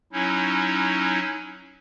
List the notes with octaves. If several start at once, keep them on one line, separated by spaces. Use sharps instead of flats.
F#3 C#4 D#4 E4